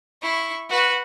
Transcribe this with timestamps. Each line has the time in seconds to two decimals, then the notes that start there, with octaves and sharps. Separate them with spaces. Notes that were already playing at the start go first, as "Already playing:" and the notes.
0.22 E4 C#6
0.69 F#4 B4